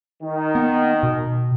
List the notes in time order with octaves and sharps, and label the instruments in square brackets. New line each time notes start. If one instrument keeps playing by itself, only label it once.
[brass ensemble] D#3
[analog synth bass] B3
B2